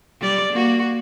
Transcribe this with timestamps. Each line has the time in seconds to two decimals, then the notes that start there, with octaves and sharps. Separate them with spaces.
0.20 G3 D5
0.53 A#3 F#4